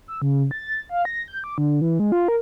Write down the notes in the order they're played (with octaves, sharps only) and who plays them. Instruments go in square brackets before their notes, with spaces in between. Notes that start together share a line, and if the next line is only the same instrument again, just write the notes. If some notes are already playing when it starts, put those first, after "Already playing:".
[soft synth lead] E6
C#3
A6
F5
A#6
G6
D6
D3
E3
G#3
F4
A#4